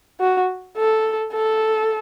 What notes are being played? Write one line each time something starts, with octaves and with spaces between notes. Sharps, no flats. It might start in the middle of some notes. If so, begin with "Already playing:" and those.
F#4
A4
A4